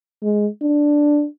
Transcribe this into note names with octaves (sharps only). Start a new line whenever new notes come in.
G#3
D4